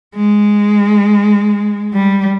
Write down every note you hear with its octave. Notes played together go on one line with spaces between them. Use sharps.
G#3
G3